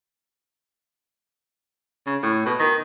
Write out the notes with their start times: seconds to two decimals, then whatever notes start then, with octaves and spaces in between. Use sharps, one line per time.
2.06 C#3
2.23 A2
2.46 B2
2.59 D#3